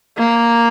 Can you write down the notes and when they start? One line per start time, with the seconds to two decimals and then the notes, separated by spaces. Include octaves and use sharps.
0.18 A#3